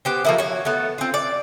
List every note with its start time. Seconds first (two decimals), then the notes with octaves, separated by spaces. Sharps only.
0.05 B3 G4 C5
0.25 F3 A#3 E4
0.38 F#4 C#5
0.65 A3 B3
0.98 C4 F4
1.14 D5